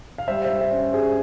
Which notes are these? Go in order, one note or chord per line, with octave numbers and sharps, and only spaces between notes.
F5
G3 C5 E5
C5 E5
G2
C5 E5
C#4
G2 G#4 C5